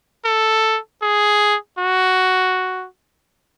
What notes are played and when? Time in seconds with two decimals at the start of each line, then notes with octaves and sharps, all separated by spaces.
0.25 A4
1.02 G#4
1.79 F#4